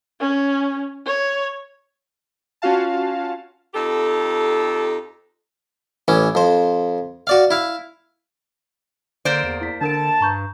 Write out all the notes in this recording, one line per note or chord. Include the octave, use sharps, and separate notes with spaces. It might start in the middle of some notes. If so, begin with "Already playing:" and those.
C#4
C#5
C#4 F4 F#4 F5 A5
F2 D#4 G4 A4
A1 E3 C#4
F2 C5
F#4 D5 F5
E4 F5
D3 A#3 C5 D5
E2
E4 B6
D3 D4 A#4 A5 D7
G2 A#5 C#6 G6